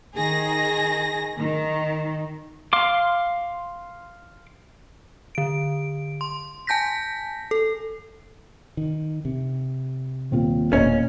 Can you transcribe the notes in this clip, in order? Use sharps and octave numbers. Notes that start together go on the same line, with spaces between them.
D#3 G#4 A#6
D#3
F5 C6 D6
D3 D7
C6
G#5 A5 G6 A#6 B6
A4
D#3
C3
D#1 C4 F4
E1 A#2 A#3 C#4 D#5